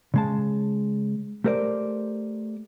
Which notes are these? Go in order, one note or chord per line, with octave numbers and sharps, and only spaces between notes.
C#3 G#3 A5
A3 G4 A#4 C5 D5